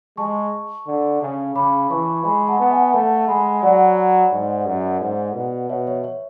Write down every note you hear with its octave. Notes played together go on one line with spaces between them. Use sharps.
G#3 A5 C#6
D3
C#3
C#3 B5 D6
E3 A5 C#6
G#3 G#5 B5
F#5 A5
B3
E5 G#5
A3 F#5 A5
G#3 G#5 B5
F#3 D5 F#5
G#2
F#2
G#2
B2
B2 C#5 E5
C#5
C#5